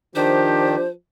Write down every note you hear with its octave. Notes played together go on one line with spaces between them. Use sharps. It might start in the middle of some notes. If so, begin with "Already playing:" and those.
D#3 F3 D4 G4 C5